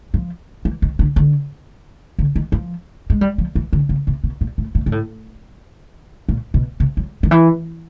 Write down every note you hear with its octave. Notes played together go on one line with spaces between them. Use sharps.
F3
E3
D#3
D3
D3
D3
D#3
F3
G#3
G3
F3
E3
D3
C#3
C3
B2
A#2
A2
A#2
A#2
A2
A#2
B2
C3
F#3
D#3
E3